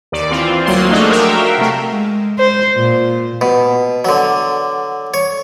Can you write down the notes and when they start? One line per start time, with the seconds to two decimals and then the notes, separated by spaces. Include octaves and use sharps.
0.12 D#2 D5
0.31 E3 C4 F4
0.66 D2 F#3 A#3 C6
0.90 F3 G#3 A3 D4 D#4 F#4
1.10 F#4 A#4 E5 F5 G5
1.58 C3 A3
1.92 G#3
2.39 C5
2.76 A#2
3.41 B2
4.05 D3 F#3
5.14 C#5